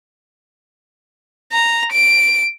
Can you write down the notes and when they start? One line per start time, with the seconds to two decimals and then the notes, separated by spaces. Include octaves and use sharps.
1.52 A#5
1.92 D7